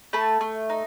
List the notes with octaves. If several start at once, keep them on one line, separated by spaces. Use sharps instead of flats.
A3 A5 B5
A3
D#4